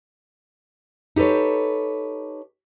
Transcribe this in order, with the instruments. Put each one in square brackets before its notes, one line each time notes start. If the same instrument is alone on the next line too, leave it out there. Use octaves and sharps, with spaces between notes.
[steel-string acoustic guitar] D#4 G4 A4 B4 C#5